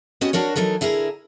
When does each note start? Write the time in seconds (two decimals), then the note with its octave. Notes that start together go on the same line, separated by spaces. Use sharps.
0.21 B3 C#4 F#4 G4 D#5
0.33 D4 F#4 A#4 C#5
0.56 E3 F#3 D#4 A4 A#4
0.81 D3 E4 G#4 A#4 A#5